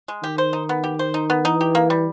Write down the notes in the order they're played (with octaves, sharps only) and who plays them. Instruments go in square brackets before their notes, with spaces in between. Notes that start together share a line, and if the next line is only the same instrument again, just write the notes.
[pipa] G#3
[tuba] D#3 [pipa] G4
[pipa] C5
D#4
B3
G4
C5
D#4
B3
[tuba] E3 [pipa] D#4
[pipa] G4
A#3
G3